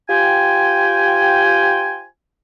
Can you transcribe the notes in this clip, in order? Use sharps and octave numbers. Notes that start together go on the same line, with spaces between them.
F4 G4 C5 G5 G#5